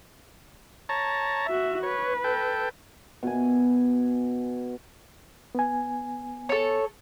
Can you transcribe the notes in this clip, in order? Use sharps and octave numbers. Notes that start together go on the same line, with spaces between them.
C#5 A5 A#5
F#4 E5
B4 C#5
A4 G5
B2 G#5
B3 G#5
A4 C#5